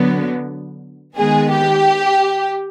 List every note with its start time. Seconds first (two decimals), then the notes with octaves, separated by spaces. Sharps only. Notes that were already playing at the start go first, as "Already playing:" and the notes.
Already playing: D3 F#3 B3
1.16 D#3 G#3 B3 G#4
1.51 G4